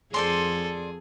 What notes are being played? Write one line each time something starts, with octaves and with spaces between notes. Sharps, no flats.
F2 G#4 A4 C5 D5 C6